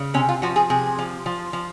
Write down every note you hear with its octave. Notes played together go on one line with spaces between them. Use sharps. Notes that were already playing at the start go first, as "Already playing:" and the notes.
Already playing: C#3
C3 C#4
F4
F3 F#4
G#4
C3 G#4
F3
F3
F3